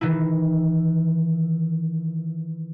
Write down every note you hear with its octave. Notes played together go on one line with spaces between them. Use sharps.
D#3 E3 D#4 E4